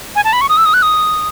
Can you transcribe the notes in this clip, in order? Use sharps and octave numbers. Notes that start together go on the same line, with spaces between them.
G#5
A5
B5
C#6
D#6
E6
D#6
F#6
D#6